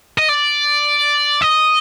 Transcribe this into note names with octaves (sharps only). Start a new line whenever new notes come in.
D#5
D5
D#5